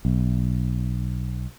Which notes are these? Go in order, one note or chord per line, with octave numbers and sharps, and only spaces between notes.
B1